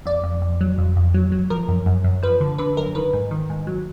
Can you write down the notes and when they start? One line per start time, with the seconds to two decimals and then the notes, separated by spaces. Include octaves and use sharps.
0.06 F2 D5
0.24 F2
0.42 F2
0.61 F#3
0.78 F2
0.96 F2
1.14 F#3
1.32 F#3
1.50 F3 A#4
1.68 F#2
1.86 F#2
2.04 F#2
2.23 F3 B4
2.41 D3
2.58 D3 B4
2.77 F#2 A#4
2.95 D#3 B4
3.13 G#2
3.31 D#3
3.50 G#2
3.67 F#3